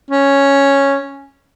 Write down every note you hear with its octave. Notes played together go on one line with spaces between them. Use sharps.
C#4